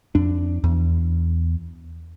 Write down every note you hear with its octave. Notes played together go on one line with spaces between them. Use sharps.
F2 D4
E2